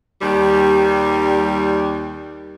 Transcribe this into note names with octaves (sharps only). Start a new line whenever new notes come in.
D#2 G3